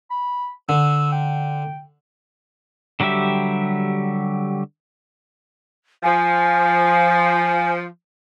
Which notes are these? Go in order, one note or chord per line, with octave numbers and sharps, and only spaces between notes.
B5
D3 E6
G5
D3 F#3 G3 G4 E5
F3 G#5